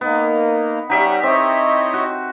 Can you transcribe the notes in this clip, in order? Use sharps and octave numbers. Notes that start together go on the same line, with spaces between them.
A#3 B3 D#4
G3 C#4 D#4 G4 E5 F#5
C4 E4 C#5 D#5
F#4